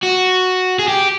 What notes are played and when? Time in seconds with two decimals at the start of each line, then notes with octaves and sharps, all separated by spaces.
0.03 F#4
0.79 G#4
0.88 G4